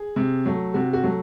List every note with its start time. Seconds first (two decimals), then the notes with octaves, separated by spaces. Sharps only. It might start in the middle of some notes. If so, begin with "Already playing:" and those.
Already playing: G#4
0.16 C3
0.45 F#3 A3
0.74 C3 F#4
0.93 F#4
1.03 F#3 A3